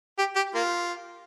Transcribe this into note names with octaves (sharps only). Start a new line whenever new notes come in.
G4
G4
A#3 F4